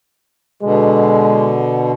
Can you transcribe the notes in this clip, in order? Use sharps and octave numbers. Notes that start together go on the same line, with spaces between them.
B2 D3 G#3